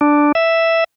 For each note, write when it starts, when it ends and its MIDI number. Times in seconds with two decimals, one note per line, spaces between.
0.01 0.32 62
0.35 0.84 76